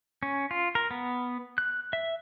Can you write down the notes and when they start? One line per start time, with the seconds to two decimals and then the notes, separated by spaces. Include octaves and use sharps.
0.23 C#4
0.51 F4
0.75 A#4
0.91 B3
1.58 F#6
1.93 E5